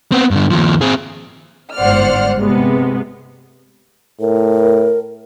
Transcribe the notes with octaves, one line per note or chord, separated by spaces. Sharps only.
B3 C4
G2 D3
D#2 F3
C4 G#4
G1 G#2 C5 D5 F#5 F6
C3 G#3 B3
A2 A#4